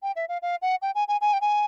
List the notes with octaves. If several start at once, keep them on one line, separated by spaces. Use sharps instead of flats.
G5
E5
F5
F5
F#5
G5
G#5
G#5
G#5
G5
G#5